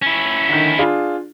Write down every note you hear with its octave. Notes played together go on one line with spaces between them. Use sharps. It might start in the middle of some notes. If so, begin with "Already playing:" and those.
C#4 E4
D3 D#3
D4 F4 G#4